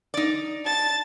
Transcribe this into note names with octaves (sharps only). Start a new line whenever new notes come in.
D#4 D5
A5 A6